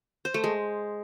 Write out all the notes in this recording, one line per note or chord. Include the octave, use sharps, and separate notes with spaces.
C5
A3
G#3